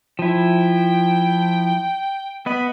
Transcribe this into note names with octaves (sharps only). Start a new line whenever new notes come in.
F3 E4 G5
B3 D#5 B5